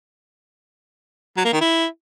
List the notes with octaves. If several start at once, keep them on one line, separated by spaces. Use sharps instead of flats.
F#3
A#3
D#3
E4